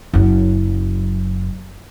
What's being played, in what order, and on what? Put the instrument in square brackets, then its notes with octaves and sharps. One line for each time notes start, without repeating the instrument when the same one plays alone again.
[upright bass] F#1 F#2